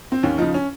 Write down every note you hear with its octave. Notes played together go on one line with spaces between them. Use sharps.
C4
D#2 C#4
C#3 F3 D#4
C#4